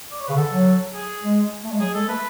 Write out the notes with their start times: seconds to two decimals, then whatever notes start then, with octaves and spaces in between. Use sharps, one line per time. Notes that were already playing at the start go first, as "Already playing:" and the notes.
0.11 D5
0.20 C#5
0.28 C#3 B4
0.37 D3 A4
0.51 F#3
0.93 G#4
1.23 G#3
1.64 A3
1.72 G#3
1.80 F#3 G#4
1.94 G#3 A4
2.08 A3 B4